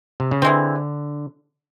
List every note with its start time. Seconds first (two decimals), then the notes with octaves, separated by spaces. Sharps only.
0.20 C3
0.31 C#3
0.42 D3 E3 G#3 C4